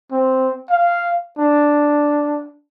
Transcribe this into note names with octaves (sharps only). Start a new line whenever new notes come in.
C4
F5
D4